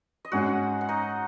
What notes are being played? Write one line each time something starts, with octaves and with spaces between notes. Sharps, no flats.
D#5
G#2 G#3 C#4 F#4 F#5
F#5
D#4 D#5